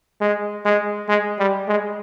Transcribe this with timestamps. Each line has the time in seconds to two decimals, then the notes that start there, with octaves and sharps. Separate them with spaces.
0.21 G#3
0.65 G#3
1.09 G#3
1.38 G3
1.68 G#3